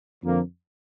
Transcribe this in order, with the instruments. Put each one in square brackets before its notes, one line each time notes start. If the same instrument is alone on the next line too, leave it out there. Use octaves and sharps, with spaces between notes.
[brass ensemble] F2 D3 F3 A#3